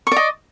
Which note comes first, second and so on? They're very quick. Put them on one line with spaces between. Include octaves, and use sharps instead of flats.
C#6 D5 D#5